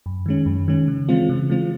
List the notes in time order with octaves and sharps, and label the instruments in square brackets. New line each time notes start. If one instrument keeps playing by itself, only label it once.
[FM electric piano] F#2
D#3 G#3 C#4
F#2
D#3 G#3 C#4
C#3
E3 G#3 C4 F4
C#3
E3 G#3 C4 F4